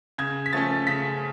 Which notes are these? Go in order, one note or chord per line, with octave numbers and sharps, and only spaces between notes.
C#3 G#6
B6
F3 A3 C#4 A6
C#3 B6